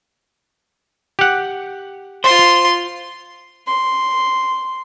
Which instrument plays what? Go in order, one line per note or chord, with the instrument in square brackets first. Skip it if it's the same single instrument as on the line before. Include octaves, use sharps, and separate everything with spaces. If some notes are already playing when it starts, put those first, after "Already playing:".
[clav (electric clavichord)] G4 F#5
[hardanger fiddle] F4 C6 [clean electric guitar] C5
[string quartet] C6